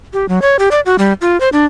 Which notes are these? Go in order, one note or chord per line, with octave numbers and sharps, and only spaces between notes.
G4
F#3
C#5
G4
D5
F#4
G3
F4
C5
D4